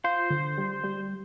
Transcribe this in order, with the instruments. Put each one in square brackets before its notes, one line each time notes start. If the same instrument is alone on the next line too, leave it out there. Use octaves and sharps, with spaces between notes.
[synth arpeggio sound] F4 [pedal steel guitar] C5
[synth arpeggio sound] D3
G3
G3